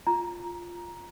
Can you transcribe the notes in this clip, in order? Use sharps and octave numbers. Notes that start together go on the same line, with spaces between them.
F4 A#5